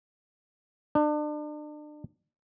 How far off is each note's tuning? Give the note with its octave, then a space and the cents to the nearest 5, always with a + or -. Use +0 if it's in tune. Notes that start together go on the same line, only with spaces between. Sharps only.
D4 +35